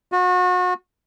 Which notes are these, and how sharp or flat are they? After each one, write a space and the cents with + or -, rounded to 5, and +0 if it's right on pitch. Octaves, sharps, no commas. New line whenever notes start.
F#4 -35